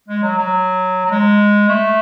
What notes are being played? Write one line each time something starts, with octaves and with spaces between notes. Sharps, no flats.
G#3
F#3
F#3
F#3
G#3
A3